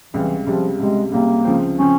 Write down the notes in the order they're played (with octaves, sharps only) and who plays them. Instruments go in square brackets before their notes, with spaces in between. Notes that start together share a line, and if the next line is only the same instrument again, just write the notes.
[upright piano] C#2 C3 G3 [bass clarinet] E3
[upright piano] C#2 C3 G3 [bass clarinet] F3
[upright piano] C#2 C3 G3 [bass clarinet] G#3
[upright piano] C#2 C3 G3 [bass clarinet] A#3
[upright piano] C#2 C#3 F3 C4
[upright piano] C#3 F3 C4 [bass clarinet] C#4